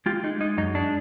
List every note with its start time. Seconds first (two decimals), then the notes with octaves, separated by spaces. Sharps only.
0.06 G#3 F4 G4
0.23 G#3 D#4
0.40 G#3 D#4
0.57 F#2 D#4
0.75 G#3 D4